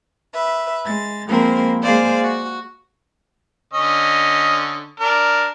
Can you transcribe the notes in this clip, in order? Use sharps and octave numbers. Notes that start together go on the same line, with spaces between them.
B4 E5
G#3 A6
F3 G#3 A#3 C4 A#4 B5
G#3 A#3 G#4 C5 D5 F5
F#4
D3 C#4 D#5
D4 A#4